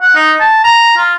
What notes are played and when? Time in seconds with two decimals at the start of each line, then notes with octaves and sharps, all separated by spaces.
0.01 F#5
0.15 D#4
0.40 A5
0.64 A#5
0.97 F4